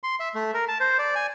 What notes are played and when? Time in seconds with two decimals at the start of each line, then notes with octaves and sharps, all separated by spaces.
0.03 C6
0.20 E5
0.35 A3
0.54 A#4
0.68 A5
0.80 C5
0.99 D5
1.15 G#5